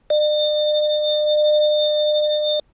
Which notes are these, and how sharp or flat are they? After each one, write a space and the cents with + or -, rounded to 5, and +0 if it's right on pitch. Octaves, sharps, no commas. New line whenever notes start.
D5 +45